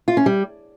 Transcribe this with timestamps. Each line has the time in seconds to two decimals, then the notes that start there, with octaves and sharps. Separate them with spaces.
0.08 F4
0.17 C#4
0.26 G3